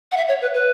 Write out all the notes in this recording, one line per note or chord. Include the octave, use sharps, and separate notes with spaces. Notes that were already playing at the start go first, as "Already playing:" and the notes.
F#5
E5
C#5
B4
B4